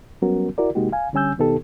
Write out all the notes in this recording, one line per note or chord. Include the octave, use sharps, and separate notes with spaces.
F#3 G3 B3 C#4 F#4 A#4
E4 F#4 A#4 D5
C3 G#3 A#3 D#4 F#4 G4
F5 G#5
D3 G3 C#4 G#5 E6 G6
B2 D#3 B3 D#4 G4 A4